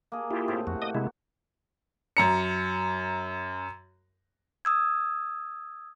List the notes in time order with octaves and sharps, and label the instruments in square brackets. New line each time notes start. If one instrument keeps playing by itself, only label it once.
[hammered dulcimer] A#3 G#4
[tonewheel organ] E4 F4 G4
[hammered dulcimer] A2 C3 C5
[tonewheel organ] F2 [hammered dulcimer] F#4
[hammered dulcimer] A#3 [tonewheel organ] D#5 D#6
[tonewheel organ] C3 G#3 E4
[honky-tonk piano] F#2 A#5 C#7
[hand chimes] D#6 E6 G#6